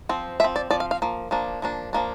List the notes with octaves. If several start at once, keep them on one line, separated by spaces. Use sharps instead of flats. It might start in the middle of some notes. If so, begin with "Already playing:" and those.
F3 C4
F3 C4 E5
D5
F3 C4 D5
F5
F5
F3 A#3
F3 A#3 D4
F3 A#3 D4
F3 A#3 D4